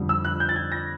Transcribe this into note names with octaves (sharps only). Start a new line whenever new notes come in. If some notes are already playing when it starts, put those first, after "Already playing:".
Already playing: F2 D3 G3
E6
F#6
G6
A6
G#6
A#6